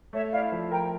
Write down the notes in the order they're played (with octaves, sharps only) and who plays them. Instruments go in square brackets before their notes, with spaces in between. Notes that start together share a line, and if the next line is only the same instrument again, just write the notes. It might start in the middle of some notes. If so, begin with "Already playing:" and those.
[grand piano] A3 [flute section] C#5 E5
[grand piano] E4 [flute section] D5 F5
[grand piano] F3
[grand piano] A#4 [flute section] G5 A#5